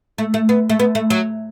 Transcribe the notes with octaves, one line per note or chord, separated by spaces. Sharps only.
A3
A3
B3
A3
B3
A3
F#3